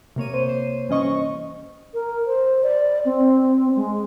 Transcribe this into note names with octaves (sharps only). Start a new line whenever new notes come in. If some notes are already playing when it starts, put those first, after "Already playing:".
C3 A#3 C#5 D#7
C5
C5
G2 E3 C#4 D#5 C#6
A#4
C5
D5
C4
G#3